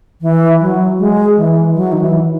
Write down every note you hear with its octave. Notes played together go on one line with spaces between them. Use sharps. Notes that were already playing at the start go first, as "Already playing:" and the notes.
E3
F#3
G#3
E3
F#3
D#3
E3